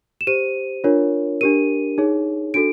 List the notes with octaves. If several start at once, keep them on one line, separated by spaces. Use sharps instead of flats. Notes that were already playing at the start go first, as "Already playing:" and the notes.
E7
G4 C5 D#7
D4 F4 A#4 C#5
D4 G4 A#4 D#7
D#4 G#4 C#5
D4 F#4 A4 D7